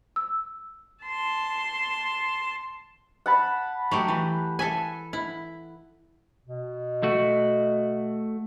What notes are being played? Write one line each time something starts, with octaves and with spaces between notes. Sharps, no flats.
E6
A5 C6
F#5 A5 B5
F#3 A3 G4
E3
A4 E5 G#5
E4
B2
A3 F#4